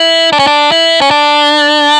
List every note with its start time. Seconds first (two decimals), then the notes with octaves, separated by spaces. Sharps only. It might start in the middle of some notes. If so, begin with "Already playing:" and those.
Already playing: E4
0.33 D4
0.39 C#4
0.47 D4
0.72 E4
1.01 C#4
1.11 D4